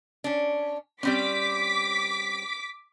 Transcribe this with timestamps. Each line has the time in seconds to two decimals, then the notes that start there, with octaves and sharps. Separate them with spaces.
0.24 C#4 D4
1.03 G3 C4 C#4 D6 B6